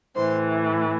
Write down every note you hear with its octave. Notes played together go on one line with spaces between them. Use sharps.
A2 E3 C5